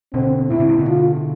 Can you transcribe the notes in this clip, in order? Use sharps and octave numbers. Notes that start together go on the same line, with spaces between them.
B2 D3 C4
A2 C3 E4
B2 D3
A2 C3
B2 D3
F4